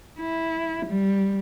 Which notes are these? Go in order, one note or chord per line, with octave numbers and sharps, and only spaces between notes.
E4
G3